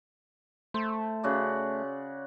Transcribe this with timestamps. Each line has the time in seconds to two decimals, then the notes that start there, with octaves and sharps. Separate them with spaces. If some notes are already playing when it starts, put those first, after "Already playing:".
0.74 A3 C5
1.23 C#3 F#4 D5